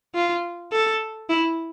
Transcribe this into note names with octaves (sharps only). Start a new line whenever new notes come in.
F4
A4
E4